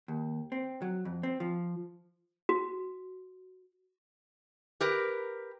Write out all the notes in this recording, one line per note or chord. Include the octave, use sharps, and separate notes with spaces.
D#2
C4
F#3
F2
C4
F3
F#4
G4 A#4 B4